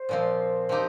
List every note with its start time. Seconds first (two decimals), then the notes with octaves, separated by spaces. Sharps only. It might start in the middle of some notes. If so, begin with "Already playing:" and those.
Already playing: C5
0.09 A#2 F3 C4
0.69 F3 C4 D#4 G4